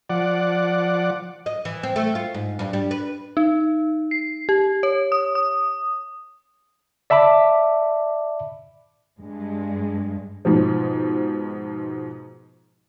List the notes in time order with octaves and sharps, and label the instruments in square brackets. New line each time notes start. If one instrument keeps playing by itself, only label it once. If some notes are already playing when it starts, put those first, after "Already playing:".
[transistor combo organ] F3 D5 F#5
[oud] D#5
E3
C4
A3
F4
G#2
G2
G3
B4
[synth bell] D#4
C7
G4
C#5
D#6
D#6
[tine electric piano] D5 E5 A5 B5 D6
[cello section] G2 G#3
[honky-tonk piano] G#2 B2 F3